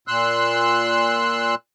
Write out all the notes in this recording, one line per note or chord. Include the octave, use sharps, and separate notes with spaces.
A#2 C6 E6 F#6